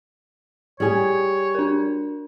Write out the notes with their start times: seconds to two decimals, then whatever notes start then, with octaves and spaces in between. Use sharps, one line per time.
0.80 G3 G#4 C#5
1.55 D4 A#4